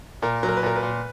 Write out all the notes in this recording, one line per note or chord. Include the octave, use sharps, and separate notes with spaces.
A#2 A#4
F#3
A#4
B4
A#2 A#4
B4
A#2